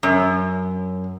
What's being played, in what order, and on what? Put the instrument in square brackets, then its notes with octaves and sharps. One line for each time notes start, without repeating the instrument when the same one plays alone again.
[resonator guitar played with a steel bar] F#2